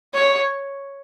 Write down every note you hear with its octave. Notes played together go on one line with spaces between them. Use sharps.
C#5